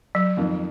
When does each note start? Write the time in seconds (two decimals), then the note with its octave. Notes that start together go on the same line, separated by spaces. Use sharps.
0.15 F#3
0.37 F2 D#3 A#3